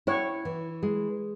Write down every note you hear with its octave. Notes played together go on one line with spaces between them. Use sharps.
E4 C#5
E3
G#3